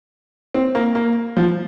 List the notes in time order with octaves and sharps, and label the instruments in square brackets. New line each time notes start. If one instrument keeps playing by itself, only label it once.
[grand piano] C4
A#3
A#3
F3